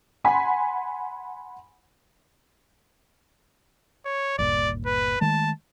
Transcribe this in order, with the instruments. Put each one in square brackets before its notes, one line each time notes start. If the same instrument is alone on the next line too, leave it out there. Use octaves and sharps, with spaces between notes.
[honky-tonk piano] F#5 G#5 B5 C6 B6
[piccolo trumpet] C#5
[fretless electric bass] G1 D#2 A#2 [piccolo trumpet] D5
[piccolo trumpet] B4
[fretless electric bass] D#3 G#3 A3 [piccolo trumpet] A5